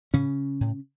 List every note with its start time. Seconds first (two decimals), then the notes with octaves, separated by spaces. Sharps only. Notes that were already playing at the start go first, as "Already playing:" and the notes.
0.13 A2 C#3 C#4
0.61 A2